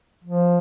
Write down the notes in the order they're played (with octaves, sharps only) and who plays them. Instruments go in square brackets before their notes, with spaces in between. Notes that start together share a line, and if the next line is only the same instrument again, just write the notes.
[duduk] F3